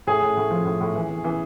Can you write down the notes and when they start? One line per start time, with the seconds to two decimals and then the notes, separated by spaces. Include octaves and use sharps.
0.07 A2 G#4
0.22 A2
0.37 A2
0.50 F3
0.65 A2
0.81 A2
0.96 E3
1.10 E3
1.24 E3